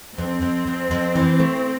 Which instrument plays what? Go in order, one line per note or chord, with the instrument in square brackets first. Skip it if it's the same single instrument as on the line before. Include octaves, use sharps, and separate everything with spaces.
[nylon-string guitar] F2 [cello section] C4
[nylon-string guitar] F2
F2
F2
E3
A3